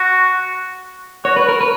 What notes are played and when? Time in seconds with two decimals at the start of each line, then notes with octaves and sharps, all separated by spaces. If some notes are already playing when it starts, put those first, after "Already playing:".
Already playing: F#4
1.25 F#4 C#5
1.36 B4
1.49 A#4
1.61 B4